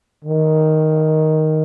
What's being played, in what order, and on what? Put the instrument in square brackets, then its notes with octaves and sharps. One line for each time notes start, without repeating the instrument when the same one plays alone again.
[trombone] D#3